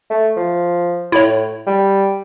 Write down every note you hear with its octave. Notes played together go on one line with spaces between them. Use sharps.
A3
F3
A2 E4 C#5
G3